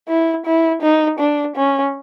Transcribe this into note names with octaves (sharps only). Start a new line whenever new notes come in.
E4
E4
D#4
D4
C#4